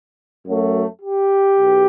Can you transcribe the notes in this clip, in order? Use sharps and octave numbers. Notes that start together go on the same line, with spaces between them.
F#2 F#3 A3
G4
B1